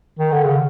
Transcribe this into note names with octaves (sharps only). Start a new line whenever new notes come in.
D#3
D3
C#3